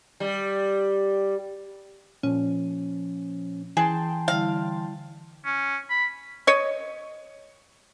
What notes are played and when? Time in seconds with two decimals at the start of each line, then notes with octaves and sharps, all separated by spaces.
0.20 G3
2.23 A#2 F3 C#4
3.77 E3 G#4 G5 A5 C6
4.28 D3 G3 E4 F5
5.45 C#4
5.90 B5
6.47 C#5 D#5